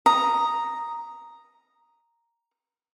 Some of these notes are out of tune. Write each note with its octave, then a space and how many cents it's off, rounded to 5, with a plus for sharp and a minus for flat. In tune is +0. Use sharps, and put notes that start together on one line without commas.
A#5 +0 D#6 +0